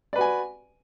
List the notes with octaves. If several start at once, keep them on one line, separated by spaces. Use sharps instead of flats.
F#4 B4 D5 G#5